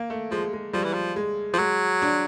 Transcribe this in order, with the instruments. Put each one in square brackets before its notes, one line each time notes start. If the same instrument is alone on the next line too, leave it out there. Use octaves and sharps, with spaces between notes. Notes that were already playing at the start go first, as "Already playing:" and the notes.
Already playing: [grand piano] A#3
A3
[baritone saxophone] F3 [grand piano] G#3
[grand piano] G#3
[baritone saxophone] F3 [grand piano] G3
[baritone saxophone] E3
F3
[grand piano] G#3
[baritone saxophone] F3
[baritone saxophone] F#3 [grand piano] G#3
[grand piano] D4